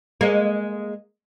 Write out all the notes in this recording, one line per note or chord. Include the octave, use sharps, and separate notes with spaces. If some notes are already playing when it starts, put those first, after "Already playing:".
G#3 A#3